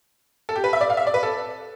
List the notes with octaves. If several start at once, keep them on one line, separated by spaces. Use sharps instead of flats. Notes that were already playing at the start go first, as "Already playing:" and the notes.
A4
G4
B4
E5
D5
F5
E5
D5
B4
A4